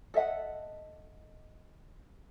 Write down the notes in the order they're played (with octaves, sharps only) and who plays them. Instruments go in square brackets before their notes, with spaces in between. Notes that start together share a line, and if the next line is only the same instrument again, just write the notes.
[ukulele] A4 D#5 E5 F#5